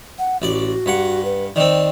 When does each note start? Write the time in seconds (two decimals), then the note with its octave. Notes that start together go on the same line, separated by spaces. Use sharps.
0.19 F#5
0.42 A1 F#4 D5
0.86 G2 F#5
1.25 B4
1.56 D#3 C4 D5